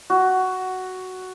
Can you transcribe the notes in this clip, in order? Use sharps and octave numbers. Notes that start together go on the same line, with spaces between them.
F#4